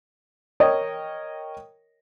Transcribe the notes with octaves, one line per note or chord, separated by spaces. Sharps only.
A#4 C#5 D#5 G5